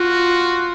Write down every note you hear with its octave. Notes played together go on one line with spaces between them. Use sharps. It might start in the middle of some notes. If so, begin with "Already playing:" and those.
Already playing: F4 F#4